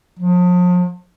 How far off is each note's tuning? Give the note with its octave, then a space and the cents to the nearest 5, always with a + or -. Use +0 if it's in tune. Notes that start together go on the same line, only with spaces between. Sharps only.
F3 +40